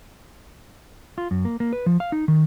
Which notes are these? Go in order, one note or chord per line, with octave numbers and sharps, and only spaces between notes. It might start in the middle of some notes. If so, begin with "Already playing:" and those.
F4
F#2
A#3
A#3
B4
F3
F5
D#4
D#3